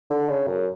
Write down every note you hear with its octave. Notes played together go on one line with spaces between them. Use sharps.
D3
C#3
F#2